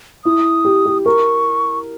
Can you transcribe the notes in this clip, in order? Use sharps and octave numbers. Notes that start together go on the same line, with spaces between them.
E4 D#6
G4
G4
A#4 C#6